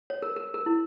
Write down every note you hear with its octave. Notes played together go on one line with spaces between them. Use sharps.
C#5
A#4
A#4
A#4
E4